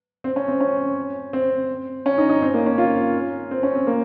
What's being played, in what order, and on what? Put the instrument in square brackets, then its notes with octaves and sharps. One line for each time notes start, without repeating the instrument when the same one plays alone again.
[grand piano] C4
C#4
C4
C#4
C4
C#4
D#4
D#4
C4
A#3
C#4
F4
C4
C#4
C4
A#3